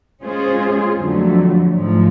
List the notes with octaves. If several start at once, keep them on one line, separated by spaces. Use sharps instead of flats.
G#3 C#4 F4 G#4 C5
F2 D3 F#3 A3
G#2 F3 A3